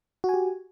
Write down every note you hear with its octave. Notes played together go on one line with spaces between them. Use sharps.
F#4 G4 G#5